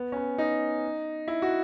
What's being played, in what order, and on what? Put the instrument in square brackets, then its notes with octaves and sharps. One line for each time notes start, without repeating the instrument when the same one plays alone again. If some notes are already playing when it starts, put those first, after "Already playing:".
Already playing: [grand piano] B3
C#4
B3
D#4
E4
F#4